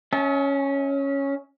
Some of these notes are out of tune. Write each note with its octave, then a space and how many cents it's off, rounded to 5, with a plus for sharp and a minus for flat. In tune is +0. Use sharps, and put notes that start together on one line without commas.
C#4 +0 E5 -45 A5 -40